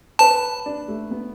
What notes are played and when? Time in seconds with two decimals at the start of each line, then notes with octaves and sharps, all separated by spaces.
0.19 B4 A5
0.66 D4
0.88 A3
1.11 B3